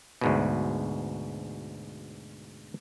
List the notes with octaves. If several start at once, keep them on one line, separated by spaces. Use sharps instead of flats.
D2 G#2 B2